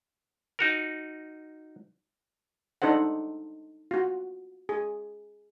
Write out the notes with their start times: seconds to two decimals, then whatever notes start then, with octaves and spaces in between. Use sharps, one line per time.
0.59 D#4 F#4 A#4
2.82 D4 D#4 A4 C5 F#5
3.91 F4 F#4
4.69 G#4